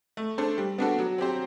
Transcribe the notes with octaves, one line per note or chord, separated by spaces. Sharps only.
A3
D4 A4 C5
G3
B3 D4 F#4 A4
F#3
C4 G4 C5